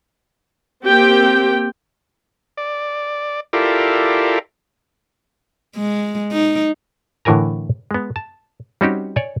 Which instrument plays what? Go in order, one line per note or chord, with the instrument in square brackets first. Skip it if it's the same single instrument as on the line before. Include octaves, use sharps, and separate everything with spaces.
[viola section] A#3 C4 G4 G5
[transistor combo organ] D5
E4 F4 G4 A4 A#4 D5
[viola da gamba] G#3
D#4
[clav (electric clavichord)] A2 D3 E3 A#4 G#5 A#5
G#3 B3
A5
G3 C4 C#4 D#4 F#4 G4
C#5 D5 G#5